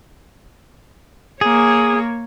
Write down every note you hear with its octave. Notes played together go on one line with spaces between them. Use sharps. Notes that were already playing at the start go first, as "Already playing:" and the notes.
A#3 G#4 C#5